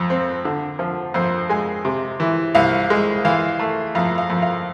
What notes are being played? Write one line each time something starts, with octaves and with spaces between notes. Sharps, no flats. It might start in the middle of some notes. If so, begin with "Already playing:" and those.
Already playing: F2
C4
D3
F3
F2 C5
G#3 G#5
C3
E3
C2 F5
G#3
E3 F5
A3
F2 F5
F5
F2
F5